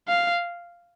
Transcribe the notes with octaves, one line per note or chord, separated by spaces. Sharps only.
F5